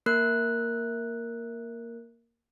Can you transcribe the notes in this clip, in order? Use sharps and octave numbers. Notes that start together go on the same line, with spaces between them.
A#3 A#4 F#6